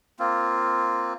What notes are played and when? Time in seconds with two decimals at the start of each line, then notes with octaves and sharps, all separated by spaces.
0.20 A#3 C4 F4